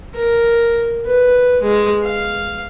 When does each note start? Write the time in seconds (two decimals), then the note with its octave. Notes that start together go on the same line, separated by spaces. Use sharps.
0.16 A#4
1.06 B4
1.63 G#3
2.05 F5